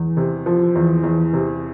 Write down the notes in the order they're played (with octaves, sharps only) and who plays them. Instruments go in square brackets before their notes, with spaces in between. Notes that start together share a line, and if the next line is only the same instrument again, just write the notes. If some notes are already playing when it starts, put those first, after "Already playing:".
Already playing: [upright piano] E2
C3
F3
E2
E2
C3